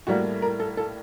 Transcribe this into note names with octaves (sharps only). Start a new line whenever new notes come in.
A2 G3 A#3 F#4
A#4
A4
A4